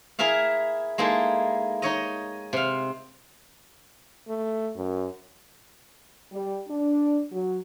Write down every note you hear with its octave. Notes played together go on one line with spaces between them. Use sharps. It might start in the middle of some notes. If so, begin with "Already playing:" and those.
E4 G#4 A#4 E5 F5
G#3 A#3 D#4 E4 A4
D#4 C#5 D#5
C3 F5
A3
F#2
G3
D4
F#3